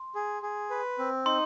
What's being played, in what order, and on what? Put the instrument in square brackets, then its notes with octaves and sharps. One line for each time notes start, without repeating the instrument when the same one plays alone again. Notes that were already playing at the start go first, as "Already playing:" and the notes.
Already playing: [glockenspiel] C6
[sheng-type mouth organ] G#4
G#4
B4
C4
[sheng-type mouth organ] D#4 [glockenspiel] C6